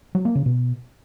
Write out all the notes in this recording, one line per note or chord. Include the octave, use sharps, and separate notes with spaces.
F#3
A#3
C#3
B2